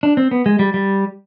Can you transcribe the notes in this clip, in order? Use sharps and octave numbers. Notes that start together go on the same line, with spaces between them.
D4
C4
B3
G#3
G3
G3